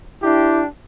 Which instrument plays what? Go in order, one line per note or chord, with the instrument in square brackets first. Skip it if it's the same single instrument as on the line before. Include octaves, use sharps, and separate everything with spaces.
[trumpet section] D4 G4 [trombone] E4